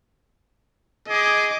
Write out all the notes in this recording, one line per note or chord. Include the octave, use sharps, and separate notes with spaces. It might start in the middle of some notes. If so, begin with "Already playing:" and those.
G#4 D#5 D6